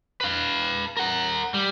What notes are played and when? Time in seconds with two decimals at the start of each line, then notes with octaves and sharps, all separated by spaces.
0.21 B4 F5
0.97 A#4 F#5
1.54 G3